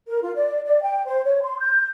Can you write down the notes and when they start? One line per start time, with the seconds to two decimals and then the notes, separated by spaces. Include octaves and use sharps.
0.09 A#4
0.23 F4
0.35 D5
0.64 D5
0.83 G5
1.06 C5
1.25 C#5
1.41 C6
1.60 G6